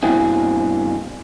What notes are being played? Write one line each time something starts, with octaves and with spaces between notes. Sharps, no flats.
G2 B2 A#3 C4 E4 G#4